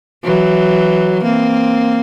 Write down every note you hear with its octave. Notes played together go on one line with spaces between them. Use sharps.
E3 F#3
A#3 C4